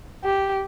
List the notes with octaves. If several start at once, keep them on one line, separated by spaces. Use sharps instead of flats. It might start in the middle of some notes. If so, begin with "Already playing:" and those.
G4